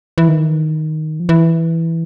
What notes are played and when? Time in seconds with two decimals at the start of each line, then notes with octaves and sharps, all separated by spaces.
0.18 E3
0.28 D#3
1.20 F3
1.29 E3